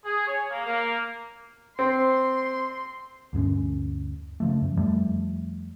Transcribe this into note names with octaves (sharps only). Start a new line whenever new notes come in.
G#4
C#5
A#3
A#3
C4 C6
D2 G2 B3 C#4
C#3 F3 A3
F#2
F2 F3 G3 A3